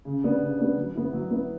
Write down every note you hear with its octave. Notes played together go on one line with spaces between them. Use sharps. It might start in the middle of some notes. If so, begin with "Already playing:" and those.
C#3
G3 B3 D4
C#3
G3 B3 D4
F#3
B3 E4
F#3
B3 E4